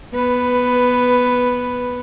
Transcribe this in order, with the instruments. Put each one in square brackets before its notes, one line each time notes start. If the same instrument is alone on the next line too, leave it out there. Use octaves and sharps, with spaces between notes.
[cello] B3 B4